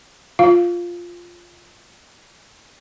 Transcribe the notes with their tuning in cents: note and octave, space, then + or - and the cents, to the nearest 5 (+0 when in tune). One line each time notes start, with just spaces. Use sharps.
F4 +0 F5 +0